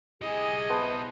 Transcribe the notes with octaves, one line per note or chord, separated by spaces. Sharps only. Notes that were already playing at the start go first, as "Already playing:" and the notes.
E4 G4 G#4 D#5
B3 C5 A5